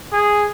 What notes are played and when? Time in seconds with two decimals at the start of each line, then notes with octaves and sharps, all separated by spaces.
0.13 G#4